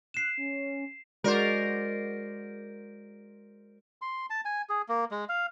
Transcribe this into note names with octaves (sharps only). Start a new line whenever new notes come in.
F#6 C7 E7
C#4
G#3 F#4 A#4 C5 D5
C6
A5
G#5
G#4
A#3
G#3
F5